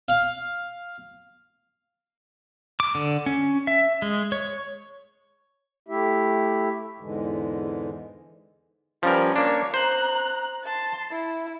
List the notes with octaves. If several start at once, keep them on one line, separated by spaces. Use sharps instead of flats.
F5
D6
D3
C#4
E5
G#3
C#5
A3 E4 G4 E5
E2 G#2 D3 E3 G#3
F3 G3 C#4 A#4 B4
A#3 D4 C#5
C5 A#5 F#6
A5 C6
E4